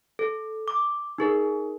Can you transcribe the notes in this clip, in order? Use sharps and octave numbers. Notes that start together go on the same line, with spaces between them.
A4
D6
D#4 G#4 A#4